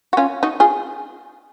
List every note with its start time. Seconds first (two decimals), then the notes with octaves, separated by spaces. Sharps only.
0.13 F#4
0.17 C#4 F4
0.43 D#4 F#4
0.60 F4 G#4